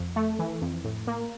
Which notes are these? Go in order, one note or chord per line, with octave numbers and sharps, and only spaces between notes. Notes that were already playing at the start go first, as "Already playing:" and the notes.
Already playing: F2
A3
E3
F2
A2
A#3